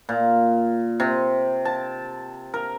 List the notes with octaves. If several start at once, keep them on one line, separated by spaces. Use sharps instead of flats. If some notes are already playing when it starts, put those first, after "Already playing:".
A#2
C3
A5
A#4